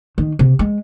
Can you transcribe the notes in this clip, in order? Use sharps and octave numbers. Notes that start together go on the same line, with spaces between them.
D#3
C3
G#3